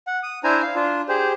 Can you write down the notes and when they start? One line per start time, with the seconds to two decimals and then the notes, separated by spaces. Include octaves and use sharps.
0.07 F#5
0.23 D#6
0.44 D4 E4 C5 G#5 A#5
0.63 F5
0.75 D4 F4
1.09 G4 G#4 C5